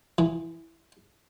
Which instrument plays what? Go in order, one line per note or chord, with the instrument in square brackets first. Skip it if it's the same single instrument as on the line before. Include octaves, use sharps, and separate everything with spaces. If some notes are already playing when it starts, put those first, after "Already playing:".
[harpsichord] E3